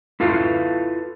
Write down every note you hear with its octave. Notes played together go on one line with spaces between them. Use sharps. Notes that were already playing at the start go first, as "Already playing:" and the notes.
E4 F4 A4 B4 F5